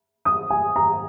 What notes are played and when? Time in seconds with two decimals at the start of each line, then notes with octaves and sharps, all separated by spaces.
0.25 D#6
0.50 G#5
0.76 A#5